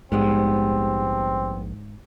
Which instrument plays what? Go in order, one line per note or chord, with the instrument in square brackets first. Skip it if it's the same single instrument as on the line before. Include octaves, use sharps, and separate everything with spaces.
[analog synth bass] A#1 [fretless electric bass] G#2 [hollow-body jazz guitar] G3 G#3 B3 [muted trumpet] C4